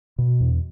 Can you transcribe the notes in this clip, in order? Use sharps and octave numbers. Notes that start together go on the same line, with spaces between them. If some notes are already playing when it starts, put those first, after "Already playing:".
B2
E2